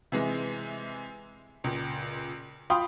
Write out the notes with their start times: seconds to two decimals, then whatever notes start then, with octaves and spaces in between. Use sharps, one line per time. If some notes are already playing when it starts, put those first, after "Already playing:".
0.12 C3 E3 G#3
1.64 C#2 A#2
2.70 F4 G5 B5 C6 D#6